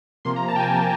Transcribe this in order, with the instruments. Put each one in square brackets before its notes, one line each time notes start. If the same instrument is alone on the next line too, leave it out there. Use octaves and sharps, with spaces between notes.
[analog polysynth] C3 F3 A#3 C6
A#5
A5
G5
G#5
C3 F3 A#3 G5